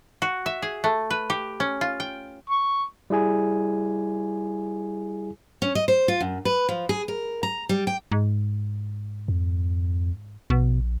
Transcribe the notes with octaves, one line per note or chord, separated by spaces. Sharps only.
F#4
E5
G#4
A3
B4
G4
C#4
F4
G5
C#6
G3 E4 G#4 G#5
C#4
D#5
C5
F4
F#2
B4
F3
G#4
A#4
A#5
G3
G5
G#2
F2
A#1 B2